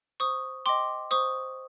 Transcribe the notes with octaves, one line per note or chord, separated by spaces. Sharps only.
C5 C#6 D#6
D#5 G5 C6 D6
C5 C#6 D#6